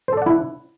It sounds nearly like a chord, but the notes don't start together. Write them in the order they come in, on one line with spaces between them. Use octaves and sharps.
C5 A4 D5 F#5 E4